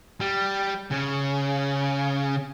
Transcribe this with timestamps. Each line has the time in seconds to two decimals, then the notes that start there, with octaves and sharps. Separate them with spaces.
0.21 G3
0.91 C#3